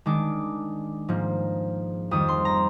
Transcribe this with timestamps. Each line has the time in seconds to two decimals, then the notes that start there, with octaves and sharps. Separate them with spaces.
0.06 D#3 G#3 D4 D6
1.08 G#2 F3 A#3
2.11 F2 D#3 G3 D#6
2.28 C6
2.45 A#5